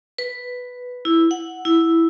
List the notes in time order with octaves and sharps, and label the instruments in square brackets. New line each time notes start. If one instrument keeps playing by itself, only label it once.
[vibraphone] B4
E4
F#5
E4